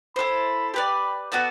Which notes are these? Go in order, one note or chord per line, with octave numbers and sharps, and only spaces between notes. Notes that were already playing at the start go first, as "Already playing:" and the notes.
E4 A4 C5 B5
G4 B4 D5 B5
B3 F#4 A4 D5